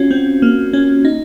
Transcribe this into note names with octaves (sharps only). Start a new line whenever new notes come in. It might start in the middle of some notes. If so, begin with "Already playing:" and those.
Already playing: C#4 F4 F#4
C4
A#3
C#4
D#4